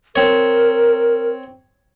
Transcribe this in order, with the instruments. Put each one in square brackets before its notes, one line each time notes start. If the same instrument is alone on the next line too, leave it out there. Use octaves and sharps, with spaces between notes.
[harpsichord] C4 C#5 [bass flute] A#4